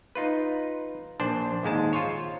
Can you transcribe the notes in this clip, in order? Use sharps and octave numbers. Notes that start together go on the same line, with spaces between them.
D#4 F4 B4
A#1 D4 C5
D#2 G#2 G#3 A5
F4 C5 C#5